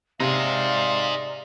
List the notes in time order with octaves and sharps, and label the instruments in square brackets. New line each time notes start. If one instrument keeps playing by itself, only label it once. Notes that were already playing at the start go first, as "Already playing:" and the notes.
[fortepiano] C3 [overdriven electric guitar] D#4 G#4 [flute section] D5 A#5 C6 [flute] F5